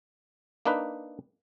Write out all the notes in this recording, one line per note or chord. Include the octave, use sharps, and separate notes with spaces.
A#3 D4 D#4 B4